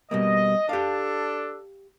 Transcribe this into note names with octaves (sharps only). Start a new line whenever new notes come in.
B2 G3 A#3 D#5
D4 G4 A4 F5